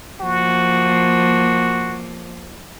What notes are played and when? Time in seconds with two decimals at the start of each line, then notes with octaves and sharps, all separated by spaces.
0.21 F3 A#3 F#4